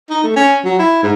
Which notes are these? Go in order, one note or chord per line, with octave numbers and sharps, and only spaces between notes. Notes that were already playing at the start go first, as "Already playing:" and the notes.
D#4
A3
C#4
F#3
E4
G#2